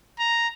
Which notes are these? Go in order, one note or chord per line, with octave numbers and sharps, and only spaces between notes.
A#5